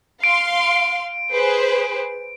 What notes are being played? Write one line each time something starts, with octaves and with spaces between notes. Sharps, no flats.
F5 C6 D7
G#4 B4 C5